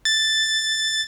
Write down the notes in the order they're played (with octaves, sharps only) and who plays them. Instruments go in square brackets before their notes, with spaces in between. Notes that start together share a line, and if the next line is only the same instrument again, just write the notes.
[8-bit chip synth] A6